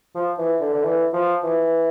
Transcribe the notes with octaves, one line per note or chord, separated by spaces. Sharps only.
F3
E3
D3
D3
E3
F3
E3